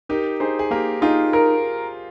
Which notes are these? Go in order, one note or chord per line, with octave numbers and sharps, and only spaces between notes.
D#4 G4 A#4
D#4 G#4 C5
G#4
A#3 G4 A#4
D#4 F4 G#4
A#4